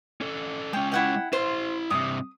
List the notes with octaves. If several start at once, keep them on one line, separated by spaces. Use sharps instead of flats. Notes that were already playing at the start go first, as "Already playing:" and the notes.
C#4 A4
G#3 C#4 G5
E4 F#5 G5
E4 C5 C6
G2 C3 D#6